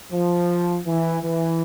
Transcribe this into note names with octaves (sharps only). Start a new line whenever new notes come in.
F3
E3
E3